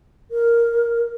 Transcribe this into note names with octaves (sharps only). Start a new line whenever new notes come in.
A#4